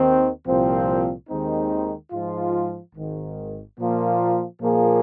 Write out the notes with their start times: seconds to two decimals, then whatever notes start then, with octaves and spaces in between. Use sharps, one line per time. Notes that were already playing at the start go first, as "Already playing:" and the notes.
Already playing: D#2 D#3 C4
0.46 C2 A#2 F3 C4
1.29 D#2 D#3 G#3 C4 D#4
2.12 G#2 F3 G#3 F4
2.94 G#1 G#2 D#3
3.77 A#2 F3 A#3 F4
4.60 A#2 F3 A#3 G#4